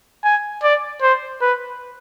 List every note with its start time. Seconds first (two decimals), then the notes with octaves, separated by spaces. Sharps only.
0.24 G#5
0.63 D5
1.02 C5
1.41 B4